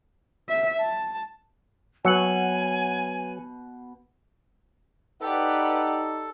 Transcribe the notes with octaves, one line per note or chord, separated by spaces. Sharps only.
E5
A5
B2 F#3 B4 G#5 C#7 F#7
D#4 G4 A4 B4 D5 F#5